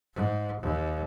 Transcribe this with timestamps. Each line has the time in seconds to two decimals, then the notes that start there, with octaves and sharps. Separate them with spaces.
0.15 G#2
0.61 D#2